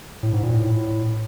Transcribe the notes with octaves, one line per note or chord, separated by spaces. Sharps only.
A2
G#2
A#2
A2